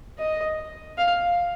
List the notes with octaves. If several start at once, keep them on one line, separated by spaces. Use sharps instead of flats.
D#5
F5